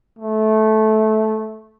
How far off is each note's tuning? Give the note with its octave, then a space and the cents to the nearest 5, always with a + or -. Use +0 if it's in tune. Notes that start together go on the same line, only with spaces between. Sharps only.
A3 -15